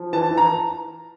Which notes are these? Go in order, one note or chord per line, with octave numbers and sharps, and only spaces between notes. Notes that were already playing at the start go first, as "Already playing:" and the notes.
Already playing: F3
E3 A5
E3
A#5